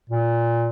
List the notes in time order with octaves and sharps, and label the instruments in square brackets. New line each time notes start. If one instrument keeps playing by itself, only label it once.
[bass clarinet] A#2